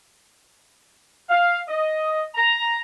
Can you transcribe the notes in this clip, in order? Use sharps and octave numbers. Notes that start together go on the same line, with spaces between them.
F5
D#5
A#5